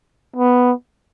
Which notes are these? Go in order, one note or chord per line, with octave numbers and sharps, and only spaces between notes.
B3